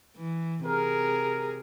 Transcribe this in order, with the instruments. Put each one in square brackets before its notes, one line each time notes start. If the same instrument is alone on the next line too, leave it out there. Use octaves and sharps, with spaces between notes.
[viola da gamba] E3
[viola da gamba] C3 G#4 [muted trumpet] A#4